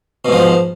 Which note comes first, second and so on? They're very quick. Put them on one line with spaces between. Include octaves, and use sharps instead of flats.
B2 G#2 F3